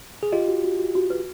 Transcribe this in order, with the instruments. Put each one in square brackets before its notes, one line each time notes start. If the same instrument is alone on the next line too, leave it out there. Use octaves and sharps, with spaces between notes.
[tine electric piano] G#4
[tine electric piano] F4 G4 [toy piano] D#5
[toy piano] F#4
F#4
F#4
F#4
B4